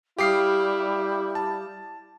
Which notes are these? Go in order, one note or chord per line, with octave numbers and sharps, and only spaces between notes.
G3 E4 G4 F5 D6 D#6 F6 C7
A5